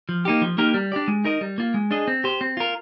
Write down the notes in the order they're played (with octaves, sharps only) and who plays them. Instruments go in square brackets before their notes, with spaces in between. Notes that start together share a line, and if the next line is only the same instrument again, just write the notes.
[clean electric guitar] F3
A#3 D#4 G4
F3
A#3 D#4 G4 A#4
G3
D4 G4 D5
G#3
D#4 A#4 D#5
G3
A#3 F4
G#3
D4 G#4 D#5
C4
G4 C5
C4
F4 A#4